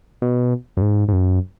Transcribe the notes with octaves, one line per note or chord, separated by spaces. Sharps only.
B2
F#2
G#2
G#2
F#2